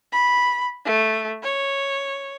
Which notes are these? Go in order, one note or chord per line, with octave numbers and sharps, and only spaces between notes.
B5
A3
C#5